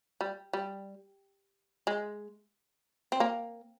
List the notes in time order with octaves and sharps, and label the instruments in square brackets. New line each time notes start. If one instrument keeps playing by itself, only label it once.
[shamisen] G3
G3
G#3
C4
A#3